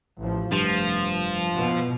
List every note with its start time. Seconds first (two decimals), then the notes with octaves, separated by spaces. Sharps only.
0.19 A1 F3
0.52 F1 G2 F3
1.55 B2